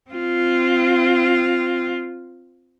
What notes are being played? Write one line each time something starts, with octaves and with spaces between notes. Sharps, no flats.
C4 F4